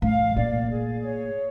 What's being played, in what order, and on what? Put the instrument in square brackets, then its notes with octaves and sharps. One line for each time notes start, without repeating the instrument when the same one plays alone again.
[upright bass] A2 [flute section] F5
[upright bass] A#2 [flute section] D5
[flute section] G#4
C#5